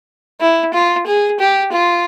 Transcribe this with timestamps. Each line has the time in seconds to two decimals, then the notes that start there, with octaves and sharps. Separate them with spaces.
0.41 E4
0.74 F4
1.07 G#4
1.40 G4
1.72 F4